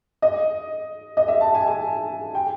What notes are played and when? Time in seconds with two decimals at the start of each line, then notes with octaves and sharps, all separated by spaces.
0.22 D#5
1.17 D#5
1.28 E5
1.41 A5
1.55 G#5
1.68 G#5
2.35 G5